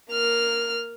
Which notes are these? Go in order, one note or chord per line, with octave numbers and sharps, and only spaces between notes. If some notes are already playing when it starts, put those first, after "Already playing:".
A#3 F6